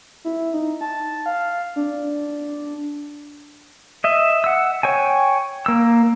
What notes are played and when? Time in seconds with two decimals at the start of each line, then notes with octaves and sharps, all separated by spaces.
0.25 E4
0.54 D#4
0.81 A5
1.26 F5
1.76 D4
4.04 D#5 E5
4.44 F#5 E6
4.83 C#5 G5 G#5
5.66 A#3 E6